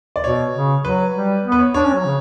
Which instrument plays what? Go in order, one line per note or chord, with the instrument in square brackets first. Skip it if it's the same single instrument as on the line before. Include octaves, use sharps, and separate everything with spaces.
[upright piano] D5
[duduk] B2 [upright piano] C#5
[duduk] C#3
[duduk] F#3 [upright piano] B4
[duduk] G3
B3
[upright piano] B4
C#5
[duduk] D4 [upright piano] C#5
[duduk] C#4
F#3
C#3